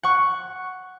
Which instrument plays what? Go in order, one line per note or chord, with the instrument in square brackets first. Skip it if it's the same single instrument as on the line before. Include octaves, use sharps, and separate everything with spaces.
[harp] F#5 C#6